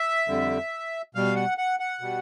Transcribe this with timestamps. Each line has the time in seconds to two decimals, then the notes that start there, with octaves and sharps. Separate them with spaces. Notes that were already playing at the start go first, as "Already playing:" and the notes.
Already playing: E5
0.28 F2 D3 G3
1.15 B2 G3 F5
1.36 F#5
1.58 F#5
1.80 F#5
2.01 B2 G3